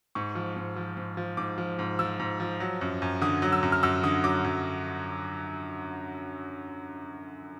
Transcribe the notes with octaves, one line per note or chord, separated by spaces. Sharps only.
G#2 C#6
F3
G#2
F3
G#2
F3
G#2 D6
F3
G#2
F3 E6
G#2
F3
F#3
F#2
F#2
D3 D#6
F#3
E6
F#2
F6
F#2 E6
D3 D#6
F#3 D6
F#2